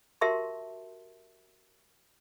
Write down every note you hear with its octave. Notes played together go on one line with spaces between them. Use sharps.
F#4 G4 A#4 E5 A5 C6